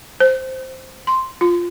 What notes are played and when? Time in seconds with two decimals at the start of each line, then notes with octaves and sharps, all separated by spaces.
0.20 C5
1.07 C6
1.41 F4